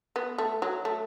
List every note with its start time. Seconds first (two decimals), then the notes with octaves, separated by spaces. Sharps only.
0.16 B3
0.38 A3
0.62 F#3
0.85 A3